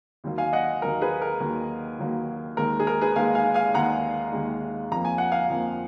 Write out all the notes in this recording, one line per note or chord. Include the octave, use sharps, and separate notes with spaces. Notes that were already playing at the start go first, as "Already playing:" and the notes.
D#2 D#3 F#3 A#3
F5 G#5
D#5 F#5
D#2 D#3 F#3 A#3 A#4
G#4 B4
A#4
D#2 D#3 F#3 A#3
D#2 D#3 F#3 A#3
D#2 D#3 G#3 A#4
G#4
A#4
G#4 B4
D#2 D#3 G#3 F5 G#5
F5 G#5
F5 G#5
D#2 D#3 G#3 F#5 A#5
D#2 D#3 G#3
F2 F3 A#3 A#5
G#5
F#5
F5 G#5
F2 F3 A#3